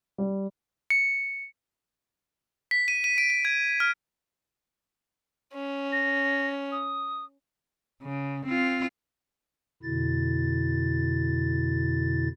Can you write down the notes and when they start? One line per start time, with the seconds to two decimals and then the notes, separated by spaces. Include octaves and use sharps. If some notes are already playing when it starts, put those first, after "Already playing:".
0.18 G3
0.90 C#7
2.71 B6
2.88 D#7
3.04 D#7
3.18 D7
3.30 D7
3.45 G#6
3.80 F6
5.54 C#4
5.92 A#6
6.72 D#6
8.03 C#3
8.46 C4 F4
9.83 F2 B2 D3 E4 A6